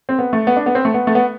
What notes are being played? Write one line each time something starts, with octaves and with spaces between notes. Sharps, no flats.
C4
B3
A3
B3
D4
B3
C4
A3
B3
A3
B3